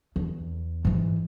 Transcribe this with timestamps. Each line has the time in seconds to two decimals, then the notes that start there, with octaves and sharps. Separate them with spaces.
0.16 E2
0.85 G#2 E3